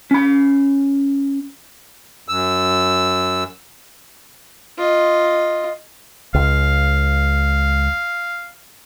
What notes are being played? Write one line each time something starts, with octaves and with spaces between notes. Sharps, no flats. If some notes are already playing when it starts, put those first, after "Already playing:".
C#4 B5
F#2 E6
F4 D#5
C#2 F5